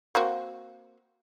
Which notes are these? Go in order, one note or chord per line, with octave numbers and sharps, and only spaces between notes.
A#3 C4 F#4